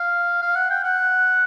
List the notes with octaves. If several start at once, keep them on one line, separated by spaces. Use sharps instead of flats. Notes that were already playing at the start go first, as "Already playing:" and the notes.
Already playing: F5
F5
F#5
G5
F#5